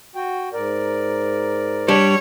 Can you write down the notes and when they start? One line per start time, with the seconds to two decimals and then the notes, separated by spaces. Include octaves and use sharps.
0.15 F#4 G5
0.53 G#2 A#4 D5
1.88 G3 D4 C#5